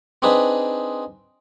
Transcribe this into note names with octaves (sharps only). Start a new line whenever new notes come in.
C4 D4 D#4 G#4 B4